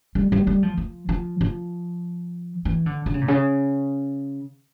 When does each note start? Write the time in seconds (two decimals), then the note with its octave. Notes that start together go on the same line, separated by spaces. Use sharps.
0.15 G3
0.32 G3
0.47 G3
0.63 F3
0.77 F3
1.09 F3
1.41 F3
2.65 E3
2.86 D3
3.06 D3
3.14 C#3
3.21 A#2
3.28 C#3